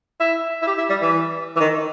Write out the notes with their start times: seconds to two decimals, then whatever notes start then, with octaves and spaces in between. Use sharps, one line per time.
0.20 E4
0.62 E4
0.67 G4
0.78 E4
0.89 G3
1.02 E3
1.56 E3
1.60 D#3